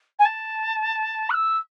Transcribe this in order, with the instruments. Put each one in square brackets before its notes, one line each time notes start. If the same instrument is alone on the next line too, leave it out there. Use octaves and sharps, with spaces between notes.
[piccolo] G#5
A5
F#6
E6